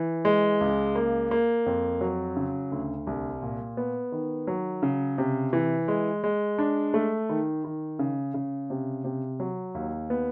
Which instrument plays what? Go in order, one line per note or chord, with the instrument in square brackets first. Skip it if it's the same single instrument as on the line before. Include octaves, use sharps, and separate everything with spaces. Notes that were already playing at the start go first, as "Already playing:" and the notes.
Already playing: [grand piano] E3
G#3
C#2
A#3
A#3
F2
F#3
C#3
D2
C2
A#2
B3
D#3
F#3
C#3
C3
E3
G#3
G#3
D4
A3
D#3
D#3
C#3
C#3
C3
C3
F#3
D#2
B3